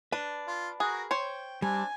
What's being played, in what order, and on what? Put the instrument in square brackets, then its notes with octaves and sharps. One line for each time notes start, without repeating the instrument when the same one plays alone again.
[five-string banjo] D4 [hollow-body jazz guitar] B4
[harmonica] F4
[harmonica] F#4 A#4 F#5 [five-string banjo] G#4
[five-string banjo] C5 C#5 [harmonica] G5
[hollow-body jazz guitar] G3 [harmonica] C4 D4 A5 [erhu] G#5